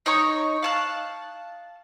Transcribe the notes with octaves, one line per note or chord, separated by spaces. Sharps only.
D#4 C#5 A#5 C#6
F5 A5 F#6